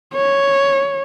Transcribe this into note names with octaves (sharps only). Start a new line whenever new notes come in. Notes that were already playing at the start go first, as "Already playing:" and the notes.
C#5